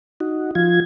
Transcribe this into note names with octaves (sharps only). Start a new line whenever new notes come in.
D#4 F#4
F3 F4 G#6